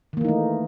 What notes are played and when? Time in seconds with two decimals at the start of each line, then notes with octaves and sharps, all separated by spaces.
0.13 D#3
0.17 A#3
0.21 E3
0.25 D#4
0.29 A3